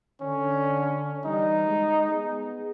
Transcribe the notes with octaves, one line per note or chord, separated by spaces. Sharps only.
D3 C#4
E3 G3 D#4
G#3
B3 G#4